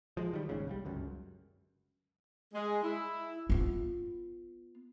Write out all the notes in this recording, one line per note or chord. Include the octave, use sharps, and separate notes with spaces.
F3 G#3
D#3 G3
G#1 D#2 G#2 C#3
C2 G3
G1 C#2 F#2
G#3
E4
B3 F4